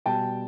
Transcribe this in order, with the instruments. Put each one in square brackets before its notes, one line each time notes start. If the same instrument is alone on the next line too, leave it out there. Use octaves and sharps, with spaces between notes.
[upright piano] B2 G3 G5 A5